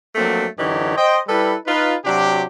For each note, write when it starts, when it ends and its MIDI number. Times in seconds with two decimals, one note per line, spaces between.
0.15 0.45 53
0.15 0.45 54
0.15 0.45 57
0.15 0.45 58
0.15 0.45 60
0.15 0.45 62
0.58 0.95 42
0.58 0.95 50
0.58 0.95 52
0.58 0.95 63
0.58 0.95 67
0.58 0.95 73
0.96 1.18 72
0.96 1.18 75
0.96 1.18 79
1.28 1.54 55
1.28 1.54 64
1.28 1.54 69
1.28 1.54 71
1.66 1.94 63
1.66 1.94 65
1.66 1.94 71
2.04 2.43 48
2.04 2.43 54
2.04 2.43 62
2.04 2.43 66
2.04 2.43 67